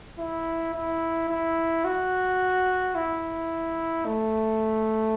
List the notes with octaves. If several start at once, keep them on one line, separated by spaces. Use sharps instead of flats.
E4
E4
E4
F#4
E4
A3